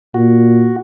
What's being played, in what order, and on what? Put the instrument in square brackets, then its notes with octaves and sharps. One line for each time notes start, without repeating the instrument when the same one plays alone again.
[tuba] A#2 [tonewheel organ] F#4